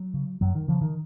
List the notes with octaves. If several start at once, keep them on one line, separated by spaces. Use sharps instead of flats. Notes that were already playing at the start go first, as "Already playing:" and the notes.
Already playing: F#3
C#3
F#2 F#3
D#3
C#3 F3
D#3